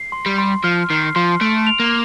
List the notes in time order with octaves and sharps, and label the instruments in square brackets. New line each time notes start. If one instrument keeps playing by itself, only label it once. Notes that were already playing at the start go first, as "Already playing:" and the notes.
Already playing: [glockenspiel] C7
C6
[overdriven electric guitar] G3
[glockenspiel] C6
[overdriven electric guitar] F3 [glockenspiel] F6
[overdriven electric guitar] D#3 [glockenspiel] C7
[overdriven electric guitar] F3 [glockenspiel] C6
[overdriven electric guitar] A3 [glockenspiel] D7
[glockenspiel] F7
[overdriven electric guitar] A#3